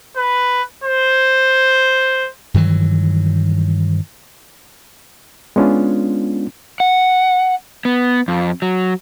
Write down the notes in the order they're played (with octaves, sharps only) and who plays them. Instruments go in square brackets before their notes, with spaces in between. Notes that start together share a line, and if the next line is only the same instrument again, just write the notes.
[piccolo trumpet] B4
C5
[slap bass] G2 D#3 E3 F#3
[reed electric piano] G#3 B3 C#4 D4 F4
[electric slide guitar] F#5
B3
F2
F#3